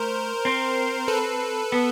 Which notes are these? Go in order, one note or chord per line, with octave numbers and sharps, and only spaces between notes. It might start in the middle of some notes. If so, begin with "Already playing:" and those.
Already playing: A3 A#4 C5
C4
A4 B4
B3